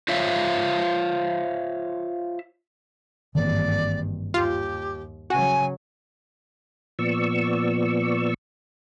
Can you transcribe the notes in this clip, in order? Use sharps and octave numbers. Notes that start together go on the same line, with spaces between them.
F4 C5 C#5 E5 F5
G#1 G2 D#3 E3 A#3 D5
D#2 F4 G4
C#3 F#3 F#4 G#5
A#2 F3 B3 D5 C#6 E6